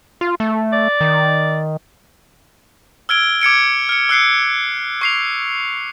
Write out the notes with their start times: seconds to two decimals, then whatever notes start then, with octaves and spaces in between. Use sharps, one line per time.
0.21 F4
0.40 A3
0.72 D5
1.01 D#3
3.09 E6 F6 G#6 D7 G7
3.41 D6 G#6 C#7 D7
3.89 F6 C#7
4.09 E6 F#6 C7 C#7
5.01 C#6 C7 F7